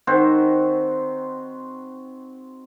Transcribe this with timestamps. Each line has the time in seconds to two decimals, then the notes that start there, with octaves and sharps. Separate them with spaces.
0.07 D#3 C4 F#4 C5